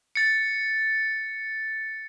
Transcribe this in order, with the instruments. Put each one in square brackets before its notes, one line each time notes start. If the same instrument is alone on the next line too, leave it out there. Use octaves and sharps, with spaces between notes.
[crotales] A6 C#7